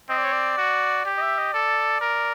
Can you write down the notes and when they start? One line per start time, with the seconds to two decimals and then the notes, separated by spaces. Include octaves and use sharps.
0.10 C4 D#5
0.17 D5
0.24 C#5
0.33 D5
0.58 F#4
1.06 G4
1.18 D#5
1.21 E5
1.38 D#5
1.54 A4 D5
2.01 A#4